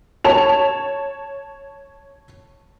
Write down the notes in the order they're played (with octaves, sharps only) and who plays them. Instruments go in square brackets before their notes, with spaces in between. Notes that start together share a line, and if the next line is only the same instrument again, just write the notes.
[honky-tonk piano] C#5 A5 F7